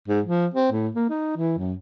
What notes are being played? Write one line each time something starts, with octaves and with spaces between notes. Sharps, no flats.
G#2
F3
C4
A2
A#3
D#4
E3
F#2